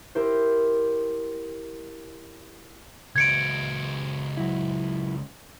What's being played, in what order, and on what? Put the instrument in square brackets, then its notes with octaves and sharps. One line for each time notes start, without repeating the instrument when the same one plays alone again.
[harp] E4 G4 A#4 C5
[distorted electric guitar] C#2 F#4 [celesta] G#6 C#7 D7
[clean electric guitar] F#3 E4